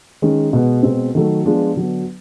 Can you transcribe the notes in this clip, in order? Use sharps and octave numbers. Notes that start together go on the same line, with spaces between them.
D#3 G#3 C#4
B2 G#3 B3
B2 G#3 C4
D#3 F#3 A3
F3 G#3 B3 D4 F4
D3 F#3 B3 D4